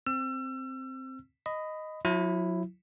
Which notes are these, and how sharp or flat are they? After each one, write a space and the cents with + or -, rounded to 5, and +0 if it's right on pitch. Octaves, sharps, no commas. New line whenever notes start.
C4 +0 E6 +35
D#5 +0 B5 +20
F#3 -35 E4 +5